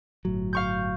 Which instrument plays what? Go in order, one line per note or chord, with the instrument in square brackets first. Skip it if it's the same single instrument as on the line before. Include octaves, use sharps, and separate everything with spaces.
[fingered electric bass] G1 A2 F#3
[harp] F5 C#6 G6